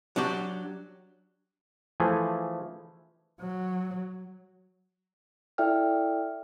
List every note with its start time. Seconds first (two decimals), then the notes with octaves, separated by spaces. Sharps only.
0.16 F#3 D4 F#4 G4
2.00 E3 F3 A3 G#4
3.41 F#3
5.58 E4 A4 D5 E5 G5 F6